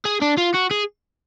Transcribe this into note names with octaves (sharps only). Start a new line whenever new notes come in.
G#4
D4
F4
F#4
G#4